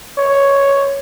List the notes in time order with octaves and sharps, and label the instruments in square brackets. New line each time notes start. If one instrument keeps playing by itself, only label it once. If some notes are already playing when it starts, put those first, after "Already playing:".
[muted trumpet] C#5